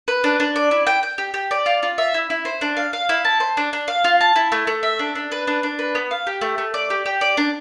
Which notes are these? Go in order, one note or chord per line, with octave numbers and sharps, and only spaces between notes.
B4
D4
D4
D5
E4
G5
G5
G4
G4
D5
F4
F4
E5
E4
E4
C5
D4
F5
F5
E4
A5
C5
D4
D4
F5
F4
A5
E4
A3
A3
E5
D4
D4
B4
D4
D4
B4
B3
F5
G4
A3
A3
D5
G4
G4
D5
D4